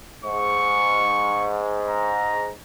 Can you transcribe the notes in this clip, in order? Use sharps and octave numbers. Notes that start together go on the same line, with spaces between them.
G#2 C#6
A#5